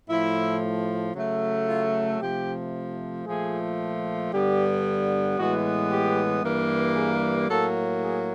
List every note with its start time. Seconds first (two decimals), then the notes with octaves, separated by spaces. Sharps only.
0.09 A2 F3 A3 E4
1.14 C#3 F#3 A3
1.68 F4
2.21 C3 F3 A3 G4
3.26 A#2 F3 A3 G#4
4.32 G2 D3 G3 B3 G4
5.38 A2 E3 G#3 B3 F#4
5.91 G4
6.43 G2 E3 G3 A#3
6.95 G#4
7.49 A2 F#3 A#3 A4
8.02 G#4